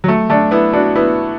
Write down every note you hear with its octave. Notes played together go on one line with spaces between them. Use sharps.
F#3
A3
A3 D4
B3 E4
D4 F#4
B3 E4